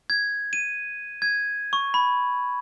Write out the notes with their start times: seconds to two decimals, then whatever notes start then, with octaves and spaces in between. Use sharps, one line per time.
0.10 G#6
0.53 D#7
1.22 G#6
1.73 C#6
1.94 B5